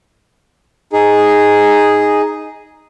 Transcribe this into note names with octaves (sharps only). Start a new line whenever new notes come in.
D#4 G#4